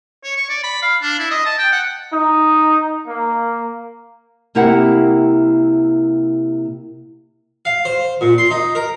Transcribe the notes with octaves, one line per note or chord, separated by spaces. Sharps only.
C#5
C#6
D5
B5
F5
D4
E4
D#5
A5
G5
F#5
D#4
A#3
C3 A#3 E4 G4 A#4 F#5
F5
C5
A#2
C6
D#4
A#4